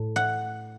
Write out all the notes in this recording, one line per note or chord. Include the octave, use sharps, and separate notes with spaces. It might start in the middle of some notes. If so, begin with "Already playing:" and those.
Already playing: A2
F#5